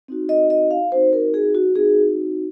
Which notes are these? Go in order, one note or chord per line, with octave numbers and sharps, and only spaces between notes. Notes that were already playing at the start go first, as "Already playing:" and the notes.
C4 D#4 F#4
D#5
D#5
F5
C4 D#4 F#4 C5
A#4
G#4
F#4
C4 D#4 F#4 G#4